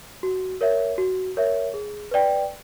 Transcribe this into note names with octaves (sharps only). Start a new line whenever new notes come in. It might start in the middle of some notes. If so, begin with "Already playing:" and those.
F#4
A#4 C#5 E5
F#4
A#4 C#5 E5
G#4
B4 D5 G5